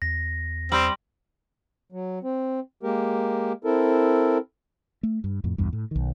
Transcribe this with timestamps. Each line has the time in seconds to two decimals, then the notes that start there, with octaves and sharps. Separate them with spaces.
0.02 E2 A#6
0.72 G3 C4 G4 C6 F#7
1.92 F#3
2.23 C4
2.83 G#3 A#3 G4 A#4
3.64 C4 E4 A4 A#4
5.03 A3
5.24 G2
5.44 F2 A2
5.58 A#1 E2 G2
5.73 A2
5.91 B1 D#3